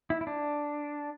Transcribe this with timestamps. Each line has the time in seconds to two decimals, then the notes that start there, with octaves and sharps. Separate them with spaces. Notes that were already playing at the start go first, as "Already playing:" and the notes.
0.10 E4
0.21 E4
0.27 D4